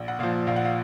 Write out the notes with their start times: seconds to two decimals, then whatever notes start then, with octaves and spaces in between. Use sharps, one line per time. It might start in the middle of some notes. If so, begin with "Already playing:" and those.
Already playing: A#1
0.08 F#5
0.19 A#2 F3 F5
0.47 A#1 F5
0.56 F#5
0.65 F5